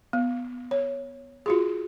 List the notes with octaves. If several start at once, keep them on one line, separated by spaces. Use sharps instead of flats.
B3
C#5
F4 F#4 G#4